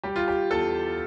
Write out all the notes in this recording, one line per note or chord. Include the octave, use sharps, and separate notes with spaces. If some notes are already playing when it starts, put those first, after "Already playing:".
G3 G4
F4
G4
E2 A4